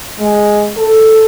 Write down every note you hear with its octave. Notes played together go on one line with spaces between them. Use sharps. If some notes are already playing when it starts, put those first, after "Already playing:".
G#3
A4